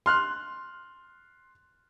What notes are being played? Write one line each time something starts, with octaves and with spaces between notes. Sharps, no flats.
C6 F6 F#6